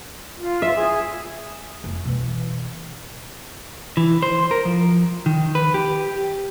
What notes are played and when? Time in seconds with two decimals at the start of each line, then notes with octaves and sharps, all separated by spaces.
0.38 F4
0.62 E5
0.74 G#4
1.84 F1
2.05 B2 E3
3.97 E3
4.23 C5
4.51 A#4
4.65 F3
5.26 D#3
5.55 B4
5.74 G4